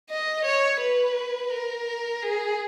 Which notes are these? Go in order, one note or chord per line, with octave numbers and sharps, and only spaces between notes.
D#5
C#5
B4
A#4
G#4